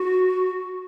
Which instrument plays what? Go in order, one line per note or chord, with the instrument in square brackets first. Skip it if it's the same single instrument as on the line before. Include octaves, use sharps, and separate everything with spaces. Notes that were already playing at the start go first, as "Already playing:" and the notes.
Already playing: [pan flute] F#4